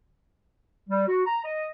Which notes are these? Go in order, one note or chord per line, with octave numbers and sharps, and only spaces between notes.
G3
F#4
A#5
D#5